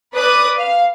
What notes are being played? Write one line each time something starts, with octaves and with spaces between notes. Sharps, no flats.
B4 D5 D6 D#6 F#6
F5